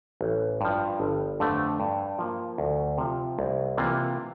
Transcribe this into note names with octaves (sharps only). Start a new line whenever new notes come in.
A1
G2 F3
G1
F2 D3 A3
G2
F3 A#3 F4
D2
C3 F3
C2
C3 E3 A#3 F4